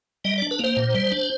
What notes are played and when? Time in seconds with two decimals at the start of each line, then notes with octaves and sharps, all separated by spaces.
0.25 G3 D#5
0.38 D4 D5
0.51 B4
0.59 A#3 C5
0.77 A#2
0.94 G3
1.12 D4